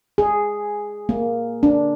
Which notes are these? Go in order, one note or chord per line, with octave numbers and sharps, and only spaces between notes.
G#4
A#3
D4